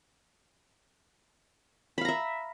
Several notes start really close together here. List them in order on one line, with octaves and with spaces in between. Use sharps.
B5 F5 A#5 E5